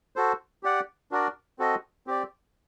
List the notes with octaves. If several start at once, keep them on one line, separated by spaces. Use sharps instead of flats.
F#4 A4 C5
G4 D5 F#5
D4 F#4 A#4 D5
C4 F#4 A4 D#5
C4 G4 D5